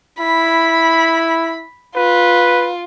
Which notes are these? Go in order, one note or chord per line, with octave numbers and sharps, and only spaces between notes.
E4 B5
F4 B4